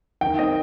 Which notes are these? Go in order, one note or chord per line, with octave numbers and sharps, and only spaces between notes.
D#3 G5
C4 D#5